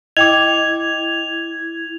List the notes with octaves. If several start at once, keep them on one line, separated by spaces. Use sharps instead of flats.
E4 D#5 G5 D6 G#6 F7